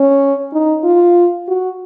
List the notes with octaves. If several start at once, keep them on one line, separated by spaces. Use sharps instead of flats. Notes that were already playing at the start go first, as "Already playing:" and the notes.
Already playing: C#4
D#4
F4
F#4